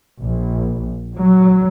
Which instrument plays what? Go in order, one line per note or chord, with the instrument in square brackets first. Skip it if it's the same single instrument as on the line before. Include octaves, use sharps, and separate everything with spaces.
[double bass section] A#1
F#3